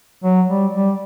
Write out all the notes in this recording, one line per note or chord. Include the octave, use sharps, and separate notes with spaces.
F#3
G3
G3